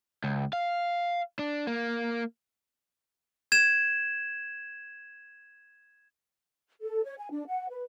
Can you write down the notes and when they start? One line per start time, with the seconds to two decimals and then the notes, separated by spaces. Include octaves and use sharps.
0.24 C#2
0.53 F5
1.39 D4
1.67 A#3
3.52 G#6 E7
6.81 A4
7.04 C#5
7.18 G#5
7.31 D4
7.48 F#5
7.69 B4